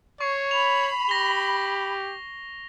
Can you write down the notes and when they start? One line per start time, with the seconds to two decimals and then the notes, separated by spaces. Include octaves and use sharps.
0.21 C#5 C#6 C7
0.51 B5 F7
1.09 G4 A#6 G7